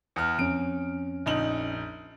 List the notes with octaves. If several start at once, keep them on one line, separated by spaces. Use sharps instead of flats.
E2 F6
F2 C#4 D7
A#1 D#4 F#7